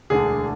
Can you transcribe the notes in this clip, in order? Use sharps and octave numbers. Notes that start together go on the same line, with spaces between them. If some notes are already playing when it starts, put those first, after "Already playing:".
E1 D2 D3 G#4